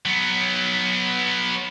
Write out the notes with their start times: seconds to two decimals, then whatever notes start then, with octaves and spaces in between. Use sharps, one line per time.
0.06 F#3 B3